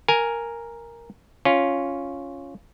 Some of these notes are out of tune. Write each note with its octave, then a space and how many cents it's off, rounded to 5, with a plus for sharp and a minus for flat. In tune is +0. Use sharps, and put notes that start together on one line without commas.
A#4 +0 G#5 +0
C#4 +0 F4 +0